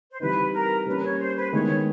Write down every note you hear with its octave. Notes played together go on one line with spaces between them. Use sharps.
C5
E3 G3 C4 D#4 B4
A#4
G3 A#3 C#4 B4
C#5
C5
B4
D#3 G#3 B3 E4 C#5